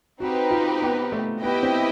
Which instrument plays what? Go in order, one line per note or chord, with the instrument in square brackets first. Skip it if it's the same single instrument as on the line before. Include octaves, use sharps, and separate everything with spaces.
[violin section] C4 D#4 G4 B4 [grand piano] F#4
[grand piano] F4
B3
A3
[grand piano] B3 [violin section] E4 G4 B4 D#5 G5
[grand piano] C4